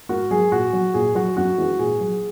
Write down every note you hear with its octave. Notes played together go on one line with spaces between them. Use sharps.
G#2 F#4 A#4
F#3 G#4
A#2 F#4
F#3
A#2 G#4
F#3 F#4
F#2 F#4
E3 G#3
A#2 G#4
F#3